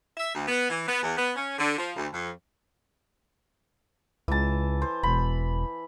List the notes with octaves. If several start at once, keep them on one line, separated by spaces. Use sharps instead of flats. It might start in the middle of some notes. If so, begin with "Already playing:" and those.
E5
D2
B3
E3
B3
E2
B3
C#4
D3
F3
D2
F2
C#2 E3 A5
C5
E1 B5